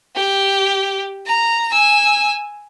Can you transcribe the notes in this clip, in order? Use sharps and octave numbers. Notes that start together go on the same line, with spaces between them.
G4
A#5
G#5 E6